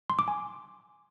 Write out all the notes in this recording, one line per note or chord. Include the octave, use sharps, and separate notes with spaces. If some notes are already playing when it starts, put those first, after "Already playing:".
C6
D6
G#5